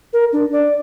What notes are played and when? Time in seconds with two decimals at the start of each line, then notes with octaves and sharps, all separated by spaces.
0.13 A#4
0.33 D4
0.52 D5